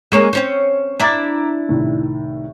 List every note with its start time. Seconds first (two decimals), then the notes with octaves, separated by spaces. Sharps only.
0.12 G#3 A#3 C#4 C#6 C7 E7
0.33 C4 C#4 C5
1.00 D4 E4 A#5 D6 A6
1.69 C2 A2 D#3